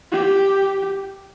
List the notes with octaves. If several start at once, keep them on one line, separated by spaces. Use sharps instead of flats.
G4